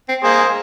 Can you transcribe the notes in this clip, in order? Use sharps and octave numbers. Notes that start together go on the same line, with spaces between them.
C4
A#3 G#4 C5